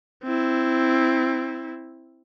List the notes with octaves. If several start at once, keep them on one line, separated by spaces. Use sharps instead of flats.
C4 E4